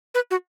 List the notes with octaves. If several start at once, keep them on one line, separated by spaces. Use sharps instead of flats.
B4
F#4